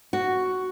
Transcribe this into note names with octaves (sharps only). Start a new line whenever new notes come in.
F#4